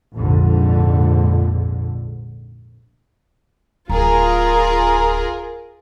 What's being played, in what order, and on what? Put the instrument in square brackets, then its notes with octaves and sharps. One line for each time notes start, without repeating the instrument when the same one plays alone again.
[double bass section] A#1 F2 G#2 D3
[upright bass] D1 [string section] F4 G#4 A#4 [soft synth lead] A#5